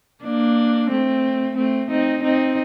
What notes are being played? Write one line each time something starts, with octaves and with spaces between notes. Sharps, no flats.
A#3 D4
A3 C4
A3 C4
C4 D#4
C4 D#4